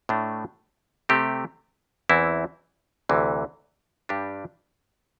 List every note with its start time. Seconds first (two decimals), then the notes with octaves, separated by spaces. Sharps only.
0.09 A2 A3 D4
1.09 C3 A3 C4 G4
2.09 E2 E3 C4 E4
3.09 D2 C3 E3
4.09 G2 G3 D4 G4